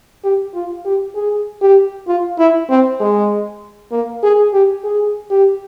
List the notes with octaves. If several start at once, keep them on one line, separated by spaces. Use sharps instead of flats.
G4
F4
G4
G#4
G4
F4
E4
C4
G#3
A#3
G#4
G4
G#4
G4